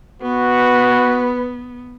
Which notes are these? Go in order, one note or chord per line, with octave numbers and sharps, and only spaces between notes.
B3 F#4 B4